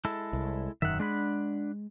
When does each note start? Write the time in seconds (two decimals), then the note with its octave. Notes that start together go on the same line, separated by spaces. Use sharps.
0.05 G#3 E4 A4
0.33 C2
0.82 E1 F#2 D#3 E5 F#5
1.00 G#3 D4 F#5 B5